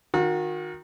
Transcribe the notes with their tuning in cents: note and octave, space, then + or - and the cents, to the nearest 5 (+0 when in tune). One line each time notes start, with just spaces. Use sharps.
D#3 +0 F#4 -35